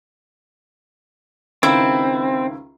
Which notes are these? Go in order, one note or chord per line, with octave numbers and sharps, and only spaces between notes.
C#2 D#3 C4 E4 F5